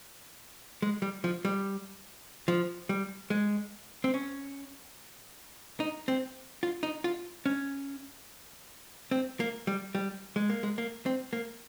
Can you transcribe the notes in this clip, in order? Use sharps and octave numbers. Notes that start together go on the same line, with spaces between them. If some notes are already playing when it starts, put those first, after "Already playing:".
G#3
G3
F3
G3
F3
G3
G#3
C4
C#4
D#4
C4
F4
D#4
F4
C#4
C4
A#3
G3
G3
G#3
A#3
G#3
A#3
C4
A#3